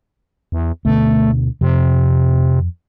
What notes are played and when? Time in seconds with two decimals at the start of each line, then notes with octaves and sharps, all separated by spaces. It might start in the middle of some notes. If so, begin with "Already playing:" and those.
0.52 E2
0.85 D2 B2 D3 A3
1.61 F2 C3